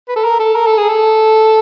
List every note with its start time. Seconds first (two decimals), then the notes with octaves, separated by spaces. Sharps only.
0.09 B4
0.16 A4
0.24 A#4
0.39 A4
0.56 A#4
0.66 A4
0.78 G#4
0.88 A4